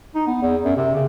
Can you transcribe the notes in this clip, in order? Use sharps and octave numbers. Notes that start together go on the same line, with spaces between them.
D#4
B3
E2
F#2
C3
C#3